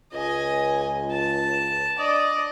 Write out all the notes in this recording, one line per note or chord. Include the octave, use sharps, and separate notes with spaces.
C#2 D#5 G#5
A5
D4 D5 D#5 D#6